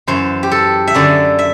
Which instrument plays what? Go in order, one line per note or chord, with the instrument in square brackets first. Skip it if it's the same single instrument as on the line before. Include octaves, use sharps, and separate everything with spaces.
[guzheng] F#2 E3 C5
G4
A4
E5
F#2 D3 D5
E5